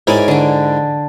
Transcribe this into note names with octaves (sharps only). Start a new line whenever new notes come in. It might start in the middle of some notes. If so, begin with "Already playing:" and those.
G#2 E4 A#4 C#5 D5 G#5
D3 D4